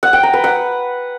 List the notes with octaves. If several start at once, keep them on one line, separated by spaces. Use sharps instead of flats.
F#5
G5
A#5
B4
F#5